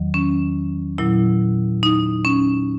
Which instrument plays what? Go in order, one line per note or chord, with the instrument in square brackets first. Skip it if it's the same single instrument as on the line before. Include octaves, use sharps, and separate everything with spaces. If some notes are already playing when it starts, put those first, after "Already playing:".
Already playing: [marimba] E2 D#3 F#3
C#4
A#2 F#3 E4
D#4
C#4